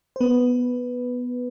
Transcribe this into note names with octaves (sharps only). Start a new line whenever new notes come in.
C5
B3 B4